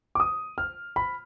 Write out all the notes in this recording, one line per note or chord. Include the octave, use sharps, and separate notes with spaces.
D6
D#6
F6
B5